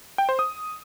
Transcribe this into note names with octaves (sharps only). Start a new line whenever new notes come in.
G5
C5
D#6